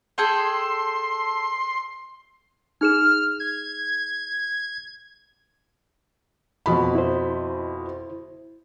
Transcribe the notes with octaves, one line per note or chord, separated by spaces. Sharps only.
G#4 A4 G5 C6
D#4 G#4 F6 E7
G#6
F2 B2 B5
E4 C5